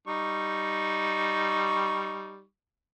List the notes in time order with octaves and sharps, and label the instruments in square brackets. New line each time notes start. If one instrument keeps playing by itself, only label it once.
[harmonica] G3 D#4 C#6